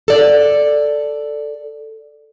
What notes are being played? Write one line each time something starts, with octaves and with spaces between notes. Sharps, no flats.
A4 D5